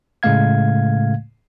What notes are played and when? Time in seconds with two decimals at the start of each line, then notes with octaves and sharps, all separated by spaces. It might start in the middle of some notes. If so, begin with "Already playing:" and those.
0.23 A2 C#3 G#3 A3 F5 G#6